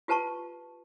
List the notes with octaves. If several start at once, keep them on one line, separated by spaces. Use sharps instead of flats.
F4 G4 B4 A5 A#5 C#6